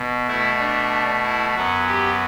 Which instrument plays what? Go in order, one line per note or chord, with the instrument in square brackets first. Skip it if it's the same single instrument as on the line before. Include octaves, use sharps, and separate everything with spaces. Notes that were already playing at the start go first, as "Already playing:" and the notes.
Already playing: [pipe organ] B2
B2 A3 E4
D4
E4
F#2 F#3 B3 F#4
G4